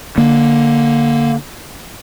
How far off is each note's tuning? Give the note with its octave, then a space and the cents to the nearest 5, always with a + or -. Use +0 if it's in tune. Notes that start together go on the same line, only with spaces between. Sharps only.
D3 +0 A#3 +0